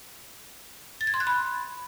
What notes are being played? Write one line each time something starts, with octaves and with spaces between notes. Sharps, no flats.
A6
G#6
C6
F#6
B5